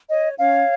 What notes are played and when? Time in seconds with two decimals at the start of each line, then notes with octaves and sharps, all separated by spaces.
0.09 C#5 D#5
0.39 C#4 C#5 F5